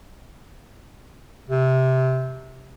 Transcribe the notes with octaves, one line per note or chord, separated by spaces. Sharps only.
C3